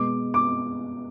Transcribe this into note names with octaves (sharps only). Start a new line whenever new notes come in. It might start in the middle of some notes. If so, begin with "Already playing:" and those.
Already playing: B2 G#3 B3 D6
D6